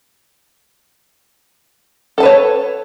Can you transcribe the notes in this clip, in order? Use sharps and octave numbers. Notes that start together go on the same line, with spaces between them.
A4 B4 C#5 A5